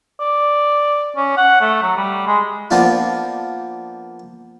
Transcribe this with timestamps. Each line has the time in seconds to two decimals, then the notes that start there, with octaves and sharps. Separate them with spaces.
0.20 D5
1.16 C#4
1.37 F#5
1.61 A3
1.82 F#3
1.97 G3
2.27 G#3
2.71 F3 A#3 B3 D4 F4